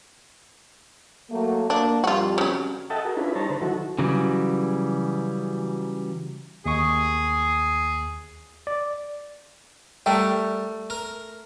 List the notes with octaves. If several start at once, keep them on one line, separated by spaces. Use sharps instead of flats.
F#3 A3 A#3
A#3 D4
F2 A#2 G3 F4 F#4
C#3 F#3
A4 D#5 E5 F#5 G5 A5
F#4 G#4 A#4
C#4 D4 E4 F4 G#4 B4
G3 D#4 C5 C#5 A5 A#5
D3 B4 C5
D#3 F#3 E4 F#4 A4
C#3 E3 F#3 G3
D#2 G#4 C#6
D5
G3 A3 A#4 G5
A#4